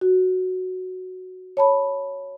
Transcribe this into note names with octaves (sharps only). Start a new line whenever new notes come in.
F#4
C#5 A5 B5